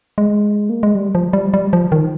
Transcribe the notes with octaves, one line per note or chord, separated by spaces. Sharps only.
G#3
A#3
G#3
G3
F3
G3
G3
F3
D#3